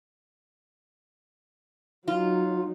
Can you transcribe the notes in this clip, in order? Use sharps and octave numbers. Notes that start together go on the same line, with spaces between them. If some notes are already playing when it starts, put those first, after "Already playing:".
F#3 D#4 F4